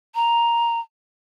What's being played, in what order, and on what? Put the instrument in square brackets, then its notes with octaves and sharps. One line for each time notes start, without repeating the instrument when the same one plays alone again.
[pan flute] A#5